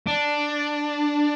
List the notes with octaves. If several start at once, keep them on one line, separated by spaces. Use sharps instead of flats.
D4